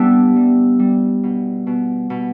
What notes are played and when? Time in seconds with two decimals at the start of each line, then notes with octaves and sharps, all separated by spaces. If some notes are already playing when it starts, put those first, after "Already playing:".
Already playing: G3 B3 D4 E4
0.36 G3
0.79 G3
1.23 B2
1.67 B2
2.10 B2